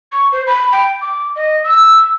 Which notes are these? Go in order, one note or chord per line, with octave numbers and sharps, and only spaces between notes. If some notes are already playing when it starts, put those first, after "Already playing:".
C#6
C5
B5
G5
D6
D#5
E6